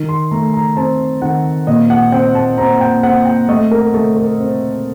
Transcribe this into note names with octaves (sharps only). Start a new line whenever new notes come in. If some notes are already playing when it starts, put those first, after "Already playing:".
Already playing: D#3
C6
A3 A#5
A#5
C4 A5
D#3 F#5
A#2 D#5
F#5
C4 G5
A5
C4 A#5
G5
C4 F#5
G5
A3 D#5
A#4
A3 A4
A#4
C4